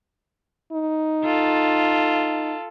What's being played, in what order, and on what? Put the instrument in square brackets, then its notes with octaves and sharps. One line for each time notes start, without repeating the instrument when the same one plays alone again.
[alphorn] D#4
[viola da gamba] F4 A4